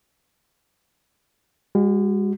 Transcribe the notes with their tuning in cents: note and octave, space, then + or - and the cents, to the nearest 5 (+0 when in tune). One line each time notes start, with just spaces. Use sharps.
G#3 -45 F#4 +0